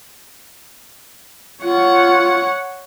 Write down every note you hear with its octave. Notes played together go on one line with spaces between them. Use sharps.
F4 C#5 F#5